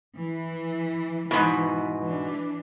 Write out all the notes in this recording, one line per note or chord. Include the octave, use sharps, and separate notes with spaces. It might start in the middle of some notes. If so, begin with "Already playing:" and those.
E3
G#2 B2 E3
E3 D4